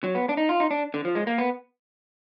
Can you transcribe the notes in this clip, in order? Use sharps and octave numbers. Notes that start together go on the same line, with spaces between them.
F#3
B3
D4
D#4
F4
D#4
D4
D3
F3
G#3
A#3
B3